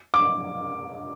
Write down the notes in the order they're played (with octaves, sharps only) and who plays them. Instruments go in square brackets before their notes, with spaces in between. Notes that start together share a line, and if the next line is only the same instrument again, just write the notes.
[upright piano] D6